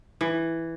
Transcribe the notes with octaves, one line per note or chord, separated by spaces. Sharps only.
E3